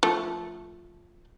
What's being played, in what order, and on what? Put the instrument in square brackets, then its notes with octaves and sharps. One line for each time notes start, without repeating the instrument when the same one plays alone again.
[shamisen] F3 A3